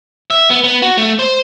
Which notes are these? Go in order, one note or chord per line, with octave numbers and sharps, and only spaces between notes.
E5
B3
B3
F#4
A3
C5